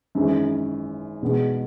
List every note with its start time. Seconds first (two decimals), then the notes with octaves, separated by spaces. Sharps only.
0.15 G#1 F#2 E3 G#3 E4
1.22 E2 B2 G#3 B3